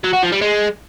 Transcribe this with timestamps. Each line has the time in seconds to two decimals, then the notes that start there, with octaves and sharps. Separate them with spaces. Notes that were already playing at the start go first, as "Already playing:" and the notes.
0.04 F#3
0.13 F#4
0.23 F3
0.32 G3
0.41 G#3